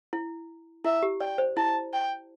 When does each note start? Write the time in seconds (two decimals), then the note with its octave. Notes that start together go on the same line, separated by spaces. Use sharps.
0.13 E4
0.85 E4 E5
1.03 G4
1.21 D5 G5
1.38 C5
1.57 E4 A5
1.93 G5